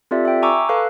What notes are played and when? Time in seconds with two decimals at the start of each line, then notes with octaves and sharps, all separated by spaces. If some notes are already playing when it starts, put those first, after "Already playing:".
0.11 C4 F4 G4 A4 D5 E5
0.25 E5 G5
0.42 G#5 A#5 C#6 D6 E6
0.69 A4 B4 F5 F#6